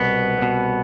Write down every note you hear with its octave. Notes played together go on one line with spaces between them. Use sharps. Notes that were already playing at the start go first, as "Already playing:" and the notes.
Already playing: C2 B2 B3
C2 B2